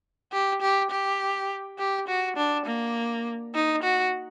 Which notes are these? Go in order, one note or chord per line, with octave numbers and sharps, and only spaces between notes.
G4
G4
G4
G4
F#4
D4
A#3
D#4
F#4